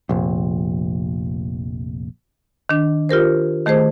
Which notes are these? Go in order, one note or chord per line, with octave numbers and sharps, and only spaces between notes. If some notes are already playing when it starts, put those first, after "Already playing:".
F1 A#1
D#3 D4
F4 G4 A#4 C5
D#3 A3 G#4 C5